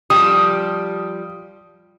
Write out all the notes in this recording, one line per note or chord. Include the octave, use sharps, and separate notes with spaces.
F3 G3 G4 D#6